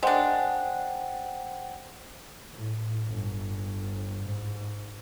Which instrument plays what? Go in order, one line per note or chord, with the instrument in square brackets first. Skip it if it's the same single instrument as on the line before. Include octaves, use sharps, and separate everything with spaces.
[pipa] G#3 D4 [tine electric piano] C5 F#5 G5
[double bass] A2
G1
G#2